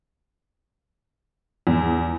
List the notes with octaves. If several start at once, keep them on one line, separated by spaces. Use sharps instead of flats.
E2